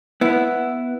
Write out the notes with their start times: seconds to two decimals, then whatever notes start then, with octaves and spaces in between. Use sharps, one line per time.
0.21 B3 E4